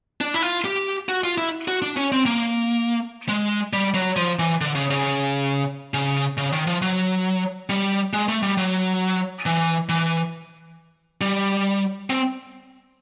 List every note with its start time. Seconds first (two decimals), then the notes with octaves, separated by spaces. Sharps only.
0.21 D4
0.34 E4
0.42 F4
0.65 G4
1.09 F#4
1.24 F4
1.38 E4
1.68 F#4
1.82 D4
1.97 C#4
2.12 C4
2.26 A#3
3.29 G#3
3.73 G3
3.95 F#3
4.16 F3
4.39 E3
4.61 D3
4.75 C#3
4.90 C#3
5.94 C#3
6.37 C#3
6.52 D#3
6.67 F3
6.82 F#3
7.69 G3
8.13 G#3
8.28 A3
8.42 G3
8.57 F#3
9.46 E3
9.89 E3
11.21 G3
12.10 C4